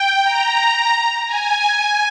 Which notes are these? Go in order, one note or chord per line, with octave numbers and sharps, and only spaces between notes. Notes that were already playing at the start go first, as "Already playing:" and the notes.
Already playing: G5
A#5
G#5